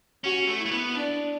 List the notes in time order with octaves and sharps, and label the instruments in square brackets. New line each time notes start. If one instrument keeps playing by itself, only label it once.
[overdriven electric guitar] C#4 [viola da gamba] F#4
[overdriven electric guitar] A3
[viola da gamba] E4
[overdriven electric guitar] A3
B3
[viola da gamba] D4